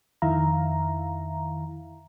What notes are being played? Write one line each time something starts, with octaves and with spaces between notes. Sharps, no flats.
F2 D#3 E4 E5 F5 A#5